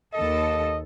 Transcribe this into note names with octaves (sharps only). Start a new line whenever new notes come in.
D#2 A4 D#5